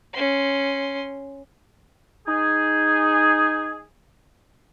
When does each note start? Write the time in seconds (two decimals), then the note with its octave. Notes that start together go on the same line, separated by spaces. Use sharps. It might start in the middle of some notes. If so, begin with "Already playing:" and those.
0.13 C#4 C6
2.27 D#4 G#4